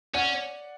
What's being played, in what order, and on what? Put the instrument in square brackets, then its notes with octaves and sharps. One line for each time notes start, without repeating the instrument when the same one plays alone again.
[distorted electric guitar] C#4 [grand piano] D5 F#5